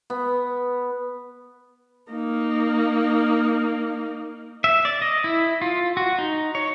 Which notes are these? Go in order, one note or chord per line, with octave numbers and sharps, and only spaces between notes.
B3
A#3 D#4
E5
D5
D#5
E4
F4
F#4
D#4
C#5